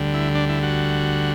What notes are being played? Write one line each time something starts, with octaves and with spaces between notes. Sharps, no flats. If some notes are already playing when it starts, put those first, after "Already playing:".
Already playing: D2 D3 G3
E4
D4
E4
F#4